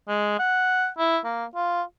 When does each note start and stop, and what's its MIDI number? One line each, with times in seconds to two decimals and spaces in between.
0.08 0.36 56
0.39 0.88 78
0.98 1.19 64
1.25 1.45 58
1.55 1.82 65